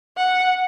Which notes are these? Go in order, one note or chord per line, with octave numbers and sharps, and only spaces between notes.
F#5